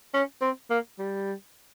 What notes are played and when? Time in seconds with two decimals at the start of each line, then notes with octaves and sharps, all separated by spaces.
0.14 C#4
0.42 C4
0.70 A#3
0.99 G3